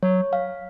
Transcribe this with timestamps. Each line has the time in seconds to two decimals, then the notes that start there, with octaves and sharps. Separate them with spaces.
0.03 F#3 C#5
0.33 F5